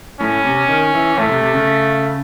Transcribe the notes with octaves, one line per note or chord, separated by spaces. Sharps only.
A2 C#4
C3
D#3
E3
A2 A3
C3
C3
C#3